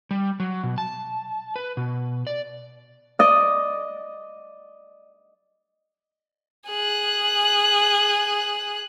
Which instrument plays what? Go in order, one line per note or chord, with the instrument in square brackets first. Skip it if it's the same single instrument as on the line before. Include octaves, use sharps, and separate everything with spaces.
[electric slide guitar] G3
F#3
B2
A5
B4
B2
D5
[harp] D5 D#5
[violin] G#4 F#6